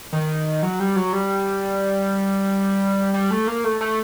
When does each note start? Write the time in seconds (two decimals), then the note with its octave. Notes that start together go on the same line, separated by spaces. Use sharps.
0.13 D#3
0.63 F#3
0.80 G3
0.96 F#3
1.13 G3
3.14 G3
3.31 A3
3.47 A#3
3.64 A3
3.81 A3